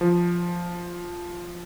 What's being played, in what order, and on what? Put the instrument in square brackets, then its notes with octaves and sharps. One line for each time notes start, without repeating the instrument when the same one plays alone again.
[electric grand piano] F3